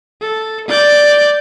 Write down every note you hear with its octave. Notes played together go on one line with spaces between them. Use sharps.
A4
D5 G6